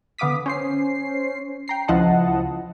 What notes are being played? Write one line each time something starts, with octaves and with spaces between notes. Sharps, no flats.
D3 B3 F5 D6 D#6 B6
C#4 C5 C7
G5 A#5 C7
C#2 F3 E4 D#5 F#5 A5